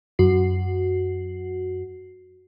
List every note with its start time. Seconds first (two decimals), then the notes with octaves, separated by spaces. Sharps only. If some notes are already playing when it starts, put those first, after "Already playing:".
0.19 F#2 F#4 C7